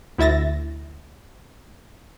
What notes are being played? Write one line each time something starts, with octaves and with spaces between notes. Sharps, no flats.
D2 E4 E5 A6 A#6